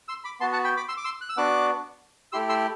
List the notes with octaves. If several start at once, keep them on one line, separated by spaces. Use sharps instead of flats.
C6 E6
B5 D6
B3 F#4 A5 C6
F#5 A5
G5 B5
B5 D6
C6 E6
D6
C6 E6
F#6
E6
B3 D4 F#4 D6 F#6
A3 E4 G4 C6 E6
C6 E6